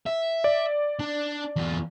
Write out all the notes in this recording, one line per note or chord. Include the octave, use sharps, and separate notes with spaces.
E5
D5
D4
E2 F4